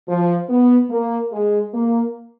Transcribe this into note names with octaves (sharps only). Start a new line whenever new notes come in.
F3
B3
A#3
G#3
A#3